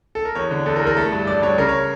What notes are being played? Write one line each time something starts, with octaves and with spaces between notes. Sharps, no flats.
A4
A#4
E2 C#5
D3
E2 A4
A#4
E2
A#4
A3 A4
G2
G2 D5
G2 C#5
C#3 A#4
C#5